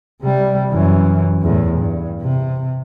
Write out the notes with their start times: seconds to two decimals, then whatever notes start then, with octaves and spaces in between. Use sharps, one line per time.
0.22 C3 G3
0.71 F#2 E3
1.42 E2 A2
1.79 G2
2.21 C3